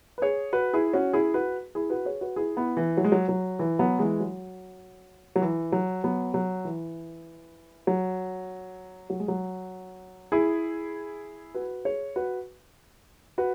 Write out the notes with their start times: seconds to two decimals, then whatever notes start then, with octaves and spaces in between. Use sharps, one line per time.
0.18 B4
0.22 G#4 C#5
0.53 F#4 B4
0.73 E4 G#4
0.93 C#4 F#4
1.13 E4 G#4
1.34 F#4 B4
1.75 E4 G#4
1.90 F#4 B4
2.05 G#4 C#5
2.21 F#4 B4
2.36 E4 G#4
2.57 B3 E4
2.77 E3
2.97 F#3
3.04 G#3
3.12 F#3
3.29 F#3
3.59 E3
3.79 F#3 B3
3.99 E3 G#3
4.20 F#3
5.36 F#3
5.42 E3
5.72 F#3
6.04 F#3 B3
6.34 F#3
6.65 E3
7.87 F#3
9.10 F#3
9.20 G#3
9.28 F#3
10.32 E4 G#4
11.55 F#4 B4
11.85 G#4 C#5
12.16 F#4 B4
13.38 F#4 B4